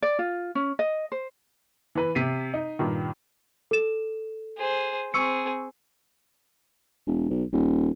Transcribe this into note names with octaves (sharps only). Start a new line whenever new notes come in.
D5
F4
C#4
D#5
C5
E3 B4
C3 B6 C7 D#7
D#4
G2 A#2 D#3
A4 E7
G#4 C5
C4 G#4 C#6 E6 C#7
E1
B1
D#1